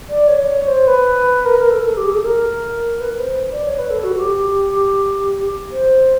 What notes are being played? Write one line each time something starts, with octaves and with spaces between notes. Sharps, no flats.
D5
C#5
C5
B4
A#4
A#4
A4
A4
G4
G#4
A4
A#4
B4
C5
D5
C#5
B4
A4
F#4
G4
C5